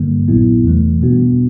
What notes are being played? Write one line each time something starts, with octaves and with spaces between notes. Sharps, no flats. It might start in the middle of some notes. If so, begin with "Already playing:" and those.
Already playing: G2 D3 G3 A#3
A#1 A#2 F#3 B3 E4
E2 C3 E3 A3
B2 G3 B3 D4 F#4